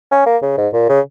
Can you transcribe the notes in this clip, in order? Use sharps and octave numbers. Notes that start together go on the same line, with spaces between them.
C#4
A#3
C#3
G#2
A#2
C#3